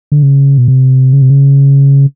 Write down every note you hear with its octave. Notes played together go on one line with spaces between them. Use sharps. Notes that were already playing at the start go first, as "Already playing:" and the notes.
D3
C#3
B2
C3
C#3
C3
C#3